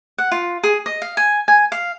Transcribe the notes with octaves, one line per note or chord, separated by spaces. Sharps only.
F#5
F4
G#4
D#5
F5
G#5
G#5
F5